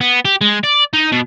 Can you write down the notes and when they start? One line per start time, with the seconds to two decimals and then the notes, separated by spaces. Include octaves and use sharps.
0.01 B3
0.25 G4
0.41 G#3
0.64 D5
0.94 D#4
1.12 B2